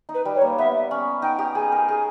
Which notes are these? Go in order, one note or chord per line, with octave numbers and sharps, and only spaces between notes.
D#4
B4
G3
C#5
A#3
B3 E5
C#4
D#4 G5
G4
G#4 G#5
A#4
G#4